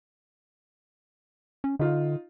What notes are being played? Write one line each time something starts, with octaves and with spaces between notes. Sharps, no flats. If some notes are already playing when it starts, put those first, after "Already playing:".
C#4
D3 D#4 F4